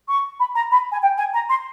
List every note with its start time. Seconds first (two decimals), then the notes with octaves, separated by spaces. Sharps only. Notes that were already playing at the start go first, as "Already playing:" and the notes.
0.08 C#6
0.39 B5
0.55 A#5
0.71 B5
0.91 G#5
1.02 G5
1.17 G#5
1.34 A#5
1.49 C6